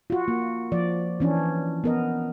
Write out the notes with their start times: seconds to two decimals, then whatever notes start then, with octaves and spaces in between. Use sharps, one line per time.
0.10 F4 F#4
0.28 A#3
0.72 F3 D5
1.20 E3 C#4 D4
1.84 B3 A#4 D#5